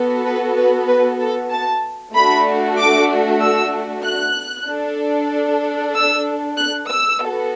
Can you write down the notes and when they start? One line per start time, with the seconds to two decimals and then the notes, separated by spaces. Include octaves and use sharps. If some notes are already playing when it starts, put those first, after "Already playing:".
Already playing: B3 F#4 A4
0.24 B4
0.56 B4
0.87 B4
1.19 A4
1.50 A5
2.13 A3 D4 F#4 B5
2.78 D6
3.41 E6
4.04 F#6
4.68 D4 A4
5.95 E6
6.57 F#6
6.89 E6
7.21 B3 F#4 A4